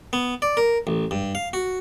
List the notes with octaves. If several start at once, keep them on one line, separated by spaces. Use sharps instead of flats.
B3
D5
A#4
A1
G2
F5
F#4